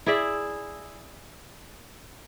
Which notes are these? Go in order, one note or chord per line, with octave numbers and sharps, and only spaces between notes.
E4 G#4 D5 E5